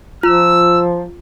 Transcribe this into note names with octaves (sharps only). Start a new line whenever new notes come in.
F3 F4 E6